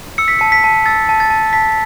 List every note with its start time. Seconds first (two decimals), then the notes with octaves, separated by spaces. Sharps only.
0.18 E6 C#7
0.28 B6
0.39 A5 C#7
0.52 B6
0.64 A5
0.86 E6 A6
1.09 A5
1.20 A6
1.30 A5
1.53 A5 B6